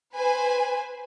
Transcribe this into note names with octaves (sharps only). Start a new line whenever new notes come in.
B4 C5 G#5